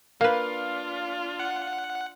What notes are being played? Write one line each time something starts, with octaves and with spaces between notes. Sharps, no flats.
A#3 D4 F4 B4 F5
F#5